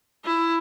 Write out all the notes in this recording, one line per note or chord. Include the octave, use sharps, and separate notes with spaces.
E4